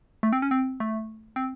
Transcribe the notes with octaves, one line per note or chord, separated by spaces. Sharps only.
A3
C4
C#4
C4
A3
C4